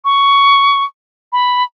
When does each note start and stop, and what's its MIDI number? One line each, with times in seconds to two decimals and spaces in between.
0.05 0.84 85
1.33 1.63 83